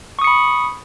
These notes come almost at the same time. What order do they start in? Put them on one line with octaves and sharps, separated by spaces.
C#6 D#6 C#7 B5